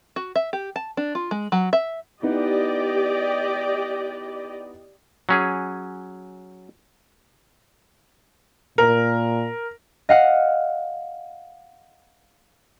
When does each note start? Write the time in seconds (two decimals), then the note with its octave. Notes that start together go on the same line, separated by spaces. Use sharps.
0.16 F#4
0.36 E5
0.53 G4
0.76 A5
0.97 D4
1.15 F4
1.31 G#3
1.52 F#3
1.73 E5
2.22 B3 D#4 E4 G4 D5 D#5
5.29 F#3 C#4 G#4
8.78 A#2 A#4
10.09 D#5 F5 F#5